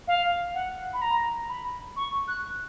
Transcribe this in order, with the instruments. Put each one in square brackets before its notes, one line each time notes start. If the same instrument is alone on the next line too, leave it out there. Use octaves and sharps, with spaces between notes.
[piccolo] F5
F#5
B5
A#5
B5
C#6
F#6